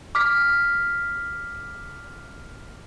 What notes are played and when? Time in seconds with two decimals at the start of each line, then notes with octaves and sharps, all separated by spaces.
0.15 D6 F6 B6